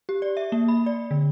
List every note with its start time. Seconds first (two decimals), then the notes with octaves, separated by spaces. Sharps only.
0.09 G4
0.22 D5
0.37 E5
0.52 A#3
0.68 B5
0.86 D5
1.11 D3